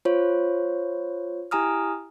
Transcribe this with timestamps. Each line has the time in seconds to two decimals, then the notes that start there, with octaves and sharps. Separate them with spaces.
0.05 F4 C5 C#5
1.51 E4 G4 G#5 A#5 D#6 F6